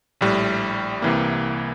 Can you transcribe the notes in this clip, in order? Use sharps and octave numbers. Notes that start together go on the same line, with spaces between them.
A#1 A2 G3
C2 C3 E3 A#3